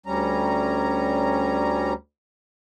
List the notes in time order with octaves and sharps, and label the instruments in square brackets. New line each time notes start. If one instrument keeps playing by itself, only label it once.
[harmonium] D2 G3 C#4 A#5